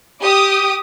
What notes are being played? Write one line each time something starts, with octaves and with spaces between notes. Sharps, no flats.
G4 D6 D#6